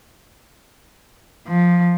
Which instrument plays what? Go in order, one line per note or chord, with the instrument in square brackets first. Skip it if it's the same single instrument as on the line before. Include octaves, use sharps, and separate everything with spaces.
[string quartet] F3